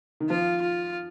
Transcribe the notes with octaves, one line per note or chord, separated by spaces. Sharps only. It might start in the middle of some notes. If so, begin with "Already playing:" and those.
D#3
F3 F4
F4